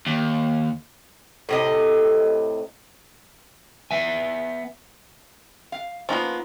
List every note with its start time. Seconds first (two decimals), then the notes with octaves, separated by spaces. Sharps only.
0.06 D#2
1.49 A2 C3 D#5
3.91 B3 E5 G#5
5.72 F5
6.09 F3 A#3 B3 C#4 D#4 F4